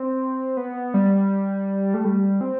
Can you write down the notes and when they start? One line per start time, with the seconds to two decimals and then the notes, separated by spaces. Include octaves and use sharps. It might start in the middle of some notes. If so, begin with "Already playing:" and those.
Already playing: C4
0.57 B3
0.94 G3
1.94 A3
2.05 G3
2.41 C4